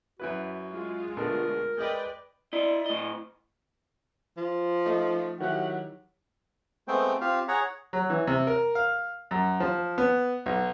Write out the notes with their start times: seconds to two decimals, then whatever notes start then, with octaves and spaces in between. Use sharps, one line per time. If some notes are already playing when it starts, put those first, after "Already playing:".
0.20 F#2 E4 F#4 B4
0.71 G#3 F4
1.17 B2 D3 A3 A#4
1.77 G#3 B4 D5 D#5 G5
2.53 E4 D5 D#5
2.86 A2 D#5
4.37 F3
4.86 A3 D#4
5.40 D#3 F#3 E4 G4 F#5
6.88 G#3 A3 B3 C4 C5 G5
7.21 C4 F4 G4 F5
7.48 G#4 C#5 F#5 A#5
7.93 F#3
8.10 E3
8.27 C3
8.47 A#4
8.75 F5
9.31 F#2
9.60 F3
9.98 B3
10.46 B1